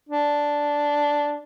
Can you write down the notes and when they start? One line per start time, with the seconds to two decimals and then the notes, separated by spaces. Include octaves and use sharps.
0.09 D4